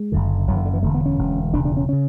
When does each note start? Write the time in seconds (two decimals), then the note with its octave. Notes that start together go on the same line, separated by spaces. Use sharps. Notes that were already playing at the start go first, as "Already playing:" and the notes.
Already playing: G#3
0.12 F#1 F#2 D3
0.47 F#1 F#2 D3 F#3
0.56 E3
0.65 D3
0.74 E3
0.83 E1 D2 D3 A3
0.94 B3
1.06 C#4
1.18 E1 D2 D3
1.53 E1 D2 C#3 D4
1.65 D4
1.77 C#4
1.89 C#3 C#4